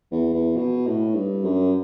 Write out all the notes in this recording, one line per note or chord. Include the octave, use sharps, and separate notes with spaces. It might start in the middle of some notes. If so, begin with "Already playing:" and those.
E2
E2
B2
A2
G2
F#2